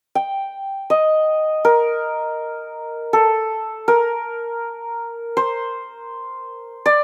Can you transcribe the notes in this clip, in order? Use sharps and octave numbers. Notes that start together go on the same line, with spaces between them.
G5
D#5
A#4
A4
A#4
C5
D5